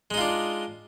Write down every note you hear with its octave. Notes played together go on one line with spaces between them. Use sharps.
G#3 D4 D#4 F4